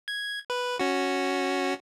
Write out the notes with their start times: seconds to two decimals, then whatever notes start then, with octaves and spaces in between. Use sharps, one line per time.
0.08 G#6
0.50 B4
0.80 C#4 F#4